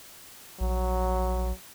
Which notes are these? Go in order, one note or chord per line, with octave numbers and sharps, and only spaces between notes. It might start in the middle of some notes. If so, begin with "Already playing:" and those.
A#1 F#3